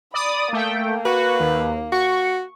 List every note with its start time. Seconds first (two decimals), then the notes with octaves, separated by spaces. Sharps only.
0.14 D5 B5 D#6
0.53 A3 A#3 G5
1.05 F#4 B4
1.40 D#2
1.92 F#4 C#6